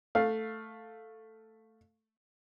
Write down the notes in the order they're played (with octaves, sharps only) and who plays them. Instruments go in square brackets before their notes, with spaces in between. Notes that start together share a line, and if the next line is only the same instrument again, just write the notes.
[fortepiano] A3 F5